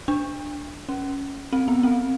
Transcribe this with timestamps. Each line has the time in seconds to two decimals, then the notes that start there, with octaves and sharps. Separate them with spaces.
0.08 D4
0.89 C#4
1.53 C4
1.68 B3
1.83 C4